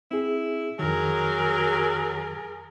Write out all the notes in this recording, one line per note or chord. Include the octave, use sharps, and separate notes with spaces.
C4 E4 G#4
F2 D#3 F#3 G#4 A#4